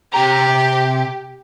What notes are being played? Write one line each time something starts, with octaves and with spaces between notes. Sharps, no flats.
C3 G4 A#5